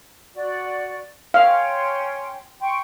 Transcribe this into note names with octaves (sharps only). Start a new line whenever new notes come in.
F#4 D5
C#4 F5 G5 C6
G5 C6 C#6